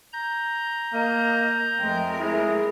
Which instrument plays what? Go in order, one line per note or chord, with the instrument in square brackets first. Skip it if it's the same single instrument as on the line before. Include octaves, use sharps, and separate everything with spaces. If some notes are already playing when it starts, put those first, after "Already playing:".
[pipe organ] A#5 G6
[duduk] A#3 [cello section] D#5
[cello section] F2 A3 A#4 [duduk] G#3 [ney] G5
[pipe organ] G#3 [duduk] E4 [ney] G#4